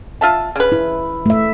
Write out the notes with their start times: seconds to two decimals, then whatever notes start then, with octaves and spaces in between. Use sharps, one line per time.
0.21 F4 E5 A5
0.56 C#3 B4
0.72 E4
1.26 A3 E5